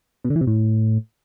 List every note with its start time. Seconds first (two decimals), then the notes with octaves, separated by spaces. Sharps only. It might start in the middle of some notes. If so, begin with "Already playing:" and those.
0.24 B2
0.30 D3
0.36 E3
0.41 C3
0.47 A2